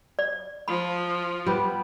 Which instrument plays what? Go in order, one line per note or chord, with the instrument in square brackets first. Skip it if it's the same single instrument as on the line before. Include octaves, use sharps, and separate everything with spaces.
[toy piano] D5
[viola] F3 [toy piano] B5
[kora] G3 B3